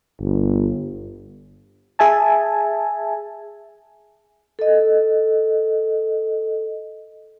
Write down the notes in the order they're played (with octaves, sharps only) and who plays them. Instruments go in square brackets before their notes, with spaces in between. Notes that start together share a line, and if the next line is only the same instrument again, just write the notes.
[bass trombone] G1
[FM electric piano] G#4 E5 G#5 A5
[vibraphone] A4 D#5